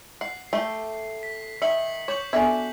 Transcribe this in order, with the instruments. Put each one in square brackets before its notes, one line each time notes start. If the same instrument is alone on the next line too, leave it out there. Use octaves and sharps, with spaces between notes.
[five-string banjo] F#5 [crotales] C7
[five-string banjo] A3 G4 A4
[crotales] B6
[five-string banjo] D#3 E5 [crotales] B6 C#7 F#7
[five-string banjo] C#5 [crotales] D6 G6 F#7
[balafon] B3 A4 G#5 [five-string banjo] D4 F#4 E5